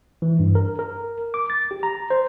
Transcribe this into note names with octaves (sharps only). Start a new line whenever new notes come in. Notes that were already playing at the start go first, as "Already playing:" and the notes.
E3
G2
A#4
A#4
D6
A6
G4
A#5
C5